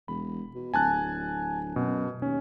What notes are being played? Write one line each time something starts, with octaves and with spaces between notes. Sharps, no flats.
E1 B5
B2
D1 G#5 A5 F#6
F#2 B2
D#2 C#4